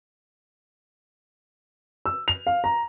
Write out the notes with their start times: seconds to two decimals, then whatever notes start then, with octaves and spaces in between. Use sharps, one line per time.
2.06 E6
2.28 F7
2.47 F5
2.64 A#5